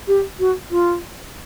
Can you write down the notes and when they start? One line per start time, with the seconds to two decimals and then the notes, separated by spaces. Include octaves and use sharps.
0.08 G4
0.39 F#4
0.71 F4